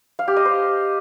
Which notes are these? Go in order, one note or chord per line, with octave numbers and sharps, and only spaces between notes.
F5
G4
D#5
C5